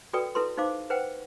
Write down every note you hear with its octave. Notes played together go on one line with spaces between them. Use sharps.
F#4 A4 B4 D5 G5 D#6
E4 A4 B4 C6
D#4 C5 F5 D6
B4 C5 F#5 G5